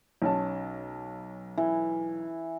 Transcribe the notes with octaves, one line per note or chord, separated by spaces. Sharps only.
B1 C#4 A5
E3